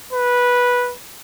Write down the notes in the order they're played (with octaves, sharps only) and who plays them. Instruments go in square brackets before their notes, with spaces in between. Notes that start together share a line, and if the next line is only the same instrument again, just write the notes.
[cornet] B4